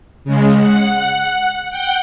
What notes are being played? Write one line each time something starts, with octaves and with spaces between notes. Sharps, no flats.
C#3 G#3
F#5
F#5 G5 G6